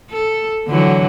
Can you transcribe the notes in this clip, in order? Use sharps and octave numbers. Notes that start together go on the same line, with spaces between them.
A4
D3 E3 F#3